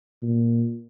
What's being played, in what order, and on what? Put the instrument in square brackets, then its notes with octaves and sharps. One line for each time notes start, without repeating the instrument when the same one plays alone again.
[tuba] A#2